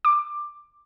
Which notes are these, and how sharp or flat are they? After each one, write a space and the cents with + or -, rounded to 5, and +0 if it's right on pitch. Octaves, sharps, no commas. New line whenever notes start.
D6 +10